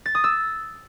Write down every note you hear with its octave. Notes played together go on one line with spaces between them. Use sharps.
A6
D#6
E6